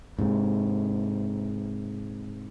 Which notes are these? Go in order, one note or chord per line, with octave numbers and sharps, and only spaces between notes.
G#2 C3